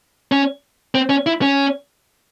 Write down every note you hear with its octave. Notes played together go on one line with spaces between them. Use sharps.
C#4
C4
C#4
E4
C#4